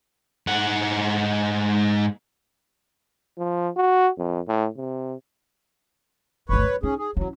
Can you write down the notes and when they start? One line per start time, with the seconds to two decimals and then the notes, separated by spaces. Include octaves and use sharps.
0.47 G#2 F#5
3.38 F3
3.76 F#4
4.18 F2
4.48 A2
4.77 C3
6.49 G1 D2 B4 C#5
6.64 F#3
6.83 C#4 D#4 G#4
6.99 G#4
7.17 F#3 C#4 E4